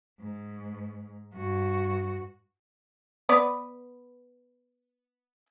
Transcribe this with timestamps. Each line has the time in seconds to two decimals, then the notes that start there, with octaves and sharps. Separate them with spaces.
0.20 G#2
1.34 G2 F#4
3.29 B3 B4 D5